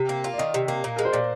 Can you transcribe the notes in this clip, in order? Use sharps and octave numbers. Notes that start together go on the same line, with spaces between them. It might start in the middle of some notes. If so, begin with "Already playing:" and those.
Already playing: C3
A#3
F4
D5
D#3 D#5
C3
A#3
A#2
G#3 A#4
C5
A#2 D5